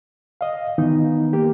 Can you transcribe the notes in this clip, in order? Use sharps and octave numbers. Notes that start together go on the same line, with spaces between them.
D#5 F5
D#3 E3 B3 D#4
A#3 G4